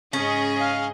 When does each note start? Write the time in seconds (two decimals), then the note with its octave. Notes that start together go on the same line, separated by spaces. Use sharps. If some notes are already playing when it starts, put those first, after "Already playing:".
0.13 G#2 C#3 C#4 G#4 D#5 C#6 A#6
0.60 F5